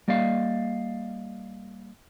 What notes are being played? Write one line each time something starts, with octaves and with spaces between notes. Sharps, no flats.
G3 A#3 D5 D#5 F5